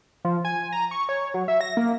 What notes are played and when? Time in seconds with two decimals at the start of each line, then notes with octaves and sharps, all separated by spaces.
0.25 F3
0.45 G#5
0.72 A#5
0.91 C#6
1.09 C#5
1.34 F#3
1.48 E5
1.61 A#6
1.77 A#3